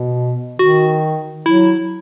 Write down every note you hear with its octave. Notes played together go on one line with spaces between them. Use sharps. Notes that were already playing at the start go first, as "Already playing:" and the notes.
Already playing: B2
D#3 F#4
F#3 E4